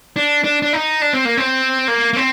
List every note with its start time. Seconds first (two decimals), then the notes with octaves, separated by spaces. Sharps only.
0.16 D4
0.44 D4
0.62 D4
0.73 D#4
1.02 D4
1.13 C4
1.25 A#3
1.37 C4
1.88 A#3
2.13 A#3
2.16 C4